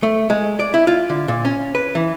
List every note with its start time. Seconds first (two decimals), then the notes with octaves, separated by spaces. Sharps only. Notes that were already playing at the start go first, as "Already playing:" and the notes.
0.03 A3
0.30 G#3
0.60 D5
0.74 E4
0.87 F4
1.10 D3
1.28 A#2
1.45 C#4
1.75 B4
1.95 E3